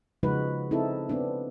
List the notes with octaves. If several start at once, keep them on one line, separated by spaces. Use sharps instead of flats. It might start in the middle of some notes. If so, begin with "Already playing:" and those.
C#3 F3 G#3 D#4 F#4 B4
C4 D#4 E4 A4
B3 C4 D4